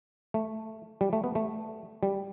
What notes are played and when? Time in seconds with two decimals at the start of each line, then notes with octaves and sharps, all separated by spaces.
0.34 A3
1.01 G3
1.13 A3
1.24 B3
1.35 A3
2.03 G3